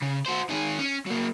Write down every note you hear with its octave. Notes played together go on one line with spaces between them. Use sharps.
C#3
F#4 C5
D#3 G#4
C#4
F#3 A#3